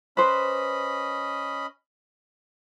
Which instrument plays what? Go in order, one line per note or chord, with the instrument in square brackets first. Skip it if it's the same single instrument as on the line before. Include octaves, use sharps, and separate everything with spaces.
[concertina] C#4 D#5 B5 [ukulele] B4 C5